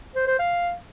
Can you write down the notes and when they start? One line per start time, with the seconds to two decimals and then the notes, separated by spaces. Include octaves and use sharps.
0.15 C5
0.27 C5
0.39 F5